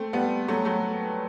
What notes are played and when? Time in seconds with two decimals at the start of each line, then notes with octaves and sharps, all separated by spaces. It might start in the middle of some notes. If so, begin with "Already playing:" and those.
Already playing: A3 C4
0.13 G3 B3
0.48 F#3 A3
0.65 F#3 A3